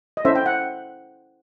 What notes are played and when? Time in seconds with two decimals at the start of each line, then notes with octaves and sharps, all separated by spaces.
0.17 D#5
0.24 C#4 E4 A4 C5 E5
0.36 G5
0.46 F#5